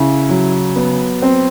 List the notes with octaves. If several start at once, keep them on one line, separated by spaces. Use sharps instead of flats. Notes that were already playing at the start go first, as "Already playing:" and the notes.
Already playing: C#3 E4
F#3
B3
C4